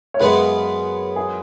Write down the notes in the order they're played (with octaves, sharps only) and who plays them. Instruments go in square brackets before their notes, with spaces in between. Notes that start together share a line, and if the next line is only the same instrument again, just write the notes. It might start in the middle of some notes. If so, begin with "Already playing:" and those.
[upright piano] C#5
[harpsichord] F#2 C#3 G#3 B3 [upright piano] B4
[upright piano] G#4